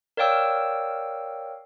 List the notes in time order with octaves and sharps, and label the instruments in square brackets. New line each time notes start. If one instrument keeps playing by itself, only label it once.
[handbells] A#4 C#5 D5 F5 G5 E6